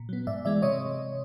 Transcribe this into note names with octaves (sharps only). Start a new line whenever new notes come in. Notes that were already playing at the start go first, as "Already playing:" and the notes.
Already playing: A#2
F#3 B3
G#2 D5 E5
E3 G#3 D5 E5
C3 C#5 D#5